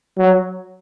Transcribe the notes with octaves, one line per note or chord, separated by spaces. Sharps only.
F#3